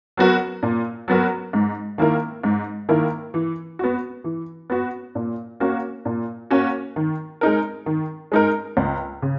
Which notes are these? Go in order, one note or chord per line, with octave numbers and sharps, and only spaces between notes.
F#3 B3 F#4 A#4
A#2
F#3 B3 F#4 A#4
G#2
D#3 A#3 E4 A#4
G#2
D#3 A#3 E4 A#4
E3
B3 F#4
E3
B3 F#4
A#2
A#3 C#4 F#4
A#2
A#3 C#4 F#4
D#3
G#3 D#4 A#4
D#3
G#3 D#4 A#4
C#2
C#3